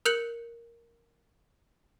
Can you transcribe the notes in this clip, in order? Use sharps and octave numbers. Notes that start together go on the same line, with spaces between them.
A#4 F#6 G6 C#7 F#7